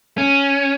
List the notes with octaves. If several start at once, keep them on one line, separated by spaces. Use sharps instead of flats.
C#4